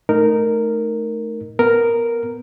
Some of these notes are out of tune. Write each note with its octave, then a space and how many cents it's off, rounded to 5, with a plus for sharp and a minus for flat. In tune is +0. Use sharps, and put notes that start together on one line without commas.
A3 -15 D#4 -10 A#4 -5
B3 +0 A#4 +0